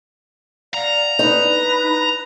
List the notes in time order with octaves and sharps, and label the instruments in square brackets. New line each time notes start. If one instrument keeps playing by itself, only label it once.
[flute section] D5 F5 F#5 [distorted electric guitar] A#5
[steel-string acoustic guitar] D#4 [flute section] B4